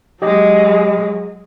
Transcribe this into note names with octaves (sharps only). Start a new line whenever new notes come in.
F#3 G#3 G4 D#5